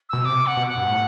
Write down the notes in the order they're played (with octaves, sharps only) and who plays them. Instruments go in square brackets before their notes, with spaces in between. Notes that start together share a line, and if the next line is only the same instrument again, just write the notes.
[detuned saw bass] B2 [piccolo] E6
[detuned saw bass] C3 [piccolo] D6
[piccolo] F#5
[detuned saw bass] B2
[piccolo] F#5
[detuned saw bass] G2
A2